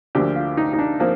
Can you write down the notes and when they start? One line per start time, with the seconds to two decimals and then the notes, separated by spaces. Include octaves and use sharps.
0.15 D2 D3 F3 A#3 G4
0.36 F4
0.57 D#4
0.73 D#4
0.79 D4
1.00 F3 A#3 C4